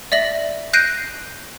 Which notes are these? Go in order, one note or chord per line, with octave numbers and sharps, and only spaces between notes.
D5 E5 A#6 F#7
F#6 G6 A#6 C7 D7 D#7